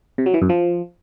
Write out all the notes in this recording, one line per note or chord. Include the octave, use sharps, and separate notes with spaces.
C3
F#3
E3
F#2
F3